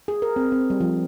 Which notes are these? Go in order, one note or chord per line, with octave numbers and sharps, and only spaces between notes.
G#4
A#4
C4
C4
G3
F3